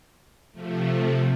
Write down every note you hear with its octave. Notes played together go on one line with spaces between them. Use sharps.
C3 F3 A3